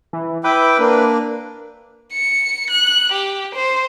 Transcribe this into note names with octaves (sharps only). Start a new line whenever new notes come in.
E3
E4 B4 G5 D6
A#3 D4
C#7
F#6
G4
C5